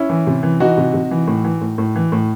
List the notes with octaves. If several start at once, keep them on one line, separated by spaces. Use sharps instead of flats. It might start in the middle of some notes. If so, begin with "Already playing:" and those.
Already playing: C#4 E4
E3
C3
E3
E3 D#4 F#4
C3
C3
E3
A2
E3
A2
A2
E3
A2